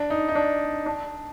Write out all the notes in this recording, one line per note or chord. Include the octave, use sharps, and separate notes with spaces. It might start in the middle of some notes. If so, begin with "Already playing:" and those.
Already playing: D4
D#4
D#4
D4
D4